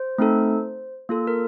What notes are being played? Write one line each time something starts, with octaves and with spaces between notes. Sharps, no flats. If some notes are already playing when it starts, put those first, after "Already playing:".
Already playing: C5
A3 C4 D#4 A4
A#3 F4 A4
A#4